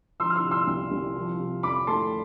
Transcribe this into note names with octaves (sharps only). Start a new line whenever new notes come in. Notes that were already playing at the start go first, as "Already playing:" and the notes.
F3 C6 E6
F6
C6 E6
C3
C6 E6
C2
C2
F3
C3
F2 B5 D6
A3 A5 C6